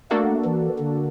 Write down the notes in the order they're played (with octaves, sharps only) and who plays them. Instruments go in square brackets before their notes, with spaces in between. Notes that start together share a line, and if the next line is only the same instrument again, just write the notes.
[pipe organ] A3 [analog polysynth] A#3 D4 F#4 A4
[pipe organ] E3
D3